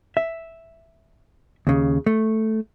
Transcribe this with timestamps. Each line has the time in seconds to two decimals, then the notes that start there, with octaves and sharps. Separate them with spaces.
0.17 E5
1.67 D#2 C#3
2.06 A3